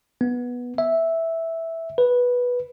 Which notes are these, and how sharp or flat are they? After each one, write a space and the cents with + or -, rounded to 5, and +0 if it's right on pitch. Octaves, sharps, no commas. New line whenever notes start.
B3 -10
E5 -5
B4 -10